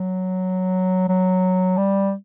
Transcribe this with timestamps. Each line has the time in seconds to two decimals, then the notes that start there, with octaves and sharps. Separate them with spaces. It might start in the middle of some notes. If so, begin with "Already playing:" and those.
Already playing: F#3
1.09 F#3
1.78 G3